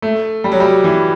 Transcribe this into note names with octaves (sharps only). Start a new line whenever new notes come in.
A3
G3
F#3
G3
E3